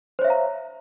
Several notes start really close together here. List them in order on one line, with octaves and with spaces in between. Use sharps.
C5 C#5 E5 F5 A#5